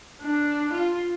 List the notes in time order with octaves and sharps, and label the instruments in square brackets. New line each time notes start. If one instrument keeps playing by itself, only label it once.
[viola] D4
F4